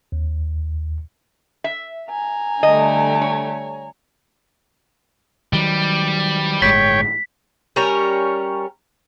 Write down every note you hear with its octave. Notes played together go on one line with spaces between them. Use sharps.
D#2
E5
G#5 A#5
D3 G3 A3 D#5
C#5
D#3 F#3 G3
G1 A2 G#3 C#5 G5 B6
G3 C#4 A#4